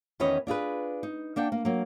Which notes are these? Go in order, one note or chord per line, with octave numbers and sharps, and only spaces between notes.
E2 D#3 C#4 B4 C#5 D#5
D4 F4 G#4 B4
D#4
A#3 D4 F#5 G5
A#3
F#3 A#3